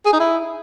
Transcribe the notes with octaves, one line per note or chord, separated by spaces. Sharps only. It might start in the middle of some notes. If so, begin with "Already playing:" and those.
G#4
D#4
E4